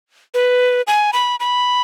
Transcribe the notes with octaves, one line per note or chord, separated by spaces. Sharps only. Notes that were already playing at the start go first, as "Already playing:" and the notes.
B4
G#5
B5
B5